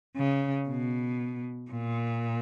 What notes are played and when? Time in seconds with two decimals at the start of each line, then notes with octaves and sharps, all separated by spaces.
0.16 C#3
0.68 B2
1.71 A#2